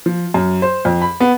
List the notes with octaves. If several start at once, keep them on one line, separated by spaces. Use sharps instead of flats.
F3
F#2
C5
F2
B5
B3